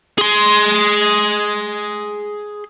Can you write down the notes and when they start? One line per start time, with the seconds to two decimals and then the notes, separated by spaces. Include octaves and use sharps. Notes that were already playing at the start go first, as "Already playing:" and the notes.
0.18 G#4 C6